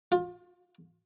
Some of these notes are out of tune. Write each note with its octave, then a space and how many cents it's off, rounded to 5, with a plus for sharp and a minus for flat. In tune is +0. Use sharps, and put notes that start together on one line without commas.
F4 +30